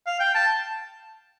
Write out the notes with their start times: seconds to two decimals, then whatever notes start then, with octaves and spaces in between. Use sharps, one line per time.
0.07 F5
0.20 G5
0.35 A5